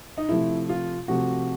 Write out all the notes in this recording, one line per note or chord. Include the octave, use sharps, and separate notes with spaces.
D#4
C3 F3 A3 E4
F4
C3 F3 A3 F#4